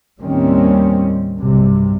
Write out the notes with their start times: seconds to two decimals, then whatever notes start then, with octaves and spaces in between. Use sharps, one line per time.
0.20 D#2 A2 D#3 G3 C4 C#4
1.40 B1 G2 C3 G3